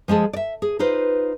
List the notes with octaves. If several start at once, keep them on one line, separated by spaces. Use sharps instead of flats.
F3 G#3 G#4 A4
D5 E5
G#4
D#4 F4 B4 C5